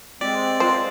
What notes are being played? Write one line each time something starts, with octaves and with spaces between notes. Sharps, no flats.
G#3 C4 G4 D5
F4 G#4 C5 D#5